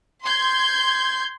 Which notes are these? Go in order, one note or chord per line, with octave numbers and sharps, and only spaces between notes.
C6 G6 G#6